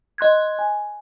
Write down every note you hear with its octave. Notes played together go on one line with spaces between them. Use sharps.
D#5 C6 F#6 G#6
G#5